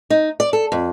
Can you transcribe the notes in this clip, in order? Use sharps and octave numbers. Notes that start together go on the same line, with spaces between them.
D#4
D5
A4
F2